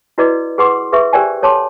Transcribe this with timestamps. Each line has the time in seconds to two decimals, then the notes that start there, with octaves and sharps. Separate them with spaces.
0.18 E4 F#4 B4 D5 D#5 D6
0.58 G#4 B4 F#5 C6 D6
0.92 G#4 B4 E5 C#6
1.13 G4 A#4 C5 D5 G5 G#5
1.42 A4 C#5 A5 C6 D6